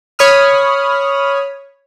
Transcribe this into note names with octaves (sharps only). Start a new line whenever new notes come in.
C#5 B5 D#6 F6